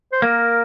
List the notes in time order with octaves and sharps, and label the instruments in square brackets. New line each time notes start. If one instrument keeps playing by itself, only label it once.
[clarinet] C5
[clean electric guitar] A#3 [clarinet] A#4